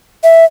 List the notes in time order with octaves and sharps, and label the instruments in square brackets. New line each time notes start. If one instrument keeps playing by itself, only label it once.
[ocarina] E5